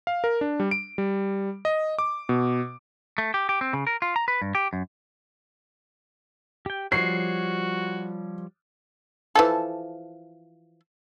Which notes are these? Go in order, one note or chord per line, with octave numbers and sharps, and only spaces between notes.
F5
A#4
D4
G3
D7
G3
D#5
D6
B2
A3
G4
G4
C4
C#3
A#4
F4
A#5
B4
G2
G4
F#2
G4 G5
F3 G3 F#4 C#5 C7
E3 F3 A4